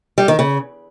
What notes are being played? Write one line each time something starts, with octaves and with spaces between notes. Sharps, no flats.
G3
D#3
C#3